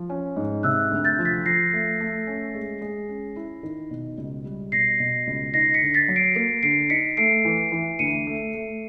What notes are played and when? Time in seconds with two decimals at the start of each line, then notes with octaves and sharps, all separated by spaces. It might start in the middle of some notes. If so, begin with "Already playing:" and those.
Already playing: F3
0.09 C#4
0.36 G#2
0.63 C3 E6 F#6
0.91 D2
1.05 G6 A6
1.19 F3
1.25 A6 B6
1.46 F3 A#6 C7
1.73 A3
2.00 A3
2.27 C#4
2.54 G#3
2.81 G#3
3.09 C#4
3.36 E4
3.63 D#3
3.91 B2
4.18 C#2
4.45 G3
4.72 B2 A#6 C7
5.00 B2
5.27 C#2
5.54 D#4 A#6 C7
5.74 B6 C#7
5.82 D3
5.94 A6 B6
6.08 F#3
6.16 C7 D7
6.36 A#3
6.63 D3 C7 D7
6.90 D#4 B6 C#7
7.17 A3 C7 D7
7.45 E3
7.72 E3
7.99 D2 C#7 D#7
8.27 A3
8.54 A3